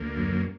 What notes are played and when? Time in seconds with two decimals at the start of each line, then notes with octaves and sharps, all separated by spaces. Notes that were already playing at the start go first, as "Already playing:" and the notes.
Already playing: D2 A#3
0.17 F#2